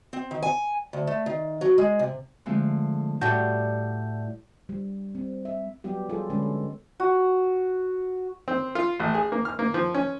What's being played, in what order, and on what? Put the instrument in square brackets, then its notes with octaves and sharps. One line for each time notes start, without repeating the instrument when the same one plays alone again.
[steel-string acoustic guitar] C4
D#3
G#5
D2
A3
D#3
F#3
G#3
C3
[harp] D3 F3 G#3 A3 C4
[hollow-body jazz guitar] A2 G4 [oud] G3 F#4 [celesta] F#5 A5 G6
[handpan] G3
C4
E5
F#3 G3 B3 G4
F3 G3 F4 G#4 A4
D3 G#3 C#4 B4
A4
[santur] F#4
[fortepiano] C4
F4
A1
G#4
A#3
F6
A#3
F3
C#4